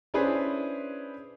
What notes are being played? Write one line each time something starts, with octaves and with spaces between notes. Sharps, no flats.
C#4 D4 E4 G#4 B4 C5